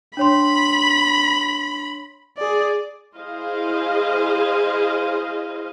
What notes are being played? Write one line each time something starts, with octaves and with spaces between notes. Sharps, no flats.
D4 C#5 B5 C6
G#4 D5
E4 G#4 C5 D#5 F5